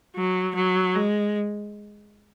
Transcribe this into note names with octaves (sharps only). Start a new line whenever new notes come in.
F#3
F#3
G#3